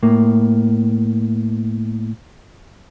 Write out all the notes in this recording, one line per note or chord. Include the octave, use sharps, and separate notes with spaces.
A2 A#3